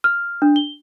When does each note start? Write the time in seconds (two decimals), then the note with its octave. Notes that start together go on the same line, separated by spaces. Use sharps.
0.04 F6
0.42 D4
0.56 G7